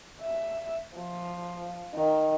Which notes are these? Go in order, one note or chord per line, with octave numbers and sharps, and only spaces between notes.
E5
F3
D#3